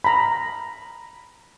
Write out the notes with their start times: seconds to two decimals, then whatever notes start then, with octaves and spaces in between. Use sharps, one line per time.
0.04 A#5 B5